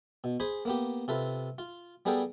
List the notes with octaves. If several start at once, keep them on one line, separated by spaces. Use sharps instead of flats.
B2
G#4 C5 G#5 B5
A#3 B3 G4
C3 F4 A4 B4
F4
G3 B3 G#4 A4 F5 G5